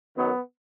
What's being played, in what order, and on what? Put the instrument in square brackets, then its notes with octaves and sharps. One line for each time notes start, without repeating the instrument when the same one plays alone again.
[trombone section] F#2 D#3 F#3 B3